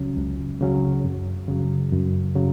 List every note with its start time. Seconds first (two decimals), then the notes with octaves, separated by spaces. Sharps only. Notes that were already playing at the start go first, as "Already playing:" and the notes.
Already playing: C#2 C#3 F#3 C#4
0.18 C#2
0.61 C#3 F#3 C#4
1.05 F#2
1.48 C#3 F#3
1.92 F#2
2.36 C#3 F#3